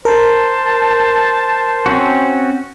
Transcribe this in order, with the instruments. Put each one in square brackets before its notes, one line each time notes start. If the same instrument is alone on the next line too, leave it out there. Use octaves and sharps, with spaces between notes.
[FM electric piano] A#4 [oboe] C5 [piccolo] A5
[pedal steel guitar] C4 C#4 F#4